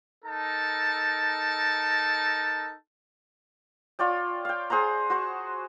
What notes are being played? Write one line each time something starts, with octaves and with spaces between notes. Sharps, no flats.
D#4 A4 A#4 A5
F4 C#5 D5 G5
F5 G5
G#4 C5 F#5 A#5
F#4 C5 C#6